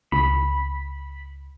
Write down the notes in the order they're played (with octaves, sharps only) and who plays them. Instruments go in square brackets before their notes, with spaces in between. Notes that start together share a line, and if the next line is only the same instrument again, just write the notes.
[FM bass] C#2 [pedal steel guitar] B5